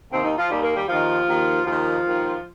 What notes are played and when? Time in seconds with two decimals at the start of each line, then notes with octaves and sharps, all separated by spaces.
0.11 D#2 C3 D#3 C4
0.24 D#3 D#4
0.37 F3 F4
0.50 D#2 D#3 G3 G4
0.63 A#3 A#4
0.76 G3 G4
0.88 D#2 D#3 F3 F4
1.28 D#2 D#3
1.66 D#2 D#3 F3 F4
2.05 D#2 D#3